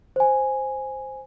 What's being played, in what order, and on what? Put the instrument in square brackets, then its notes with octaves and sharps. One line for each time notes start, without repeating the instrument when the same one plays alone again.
[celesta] C5 G#5